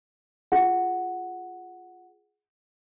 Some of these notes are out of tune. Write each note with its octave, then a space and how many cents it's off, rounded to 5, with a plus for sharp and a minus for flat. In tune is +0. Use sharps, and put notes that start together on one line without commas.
F4 +0 G#4 +0 F#5 +0